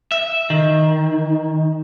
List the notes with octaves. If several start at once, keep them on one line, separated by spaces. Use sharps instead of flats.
E5
D#3